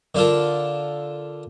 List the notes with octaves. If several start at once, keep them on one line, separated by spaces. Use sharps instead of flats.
D3 D4 F4 A4 A#4